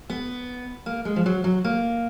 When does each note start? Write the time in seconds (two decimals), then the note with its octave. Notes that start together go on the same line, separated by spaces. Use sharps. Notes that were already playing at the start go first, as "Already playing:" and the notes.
0.10 B3
0.86 A#3
1.05 G#3
1.16 F3
1.26 F#3
1.44 F#3
1.65 A#3